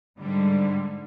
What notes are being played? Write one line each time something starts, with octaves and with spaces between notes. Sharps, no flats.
G#2 D3 G3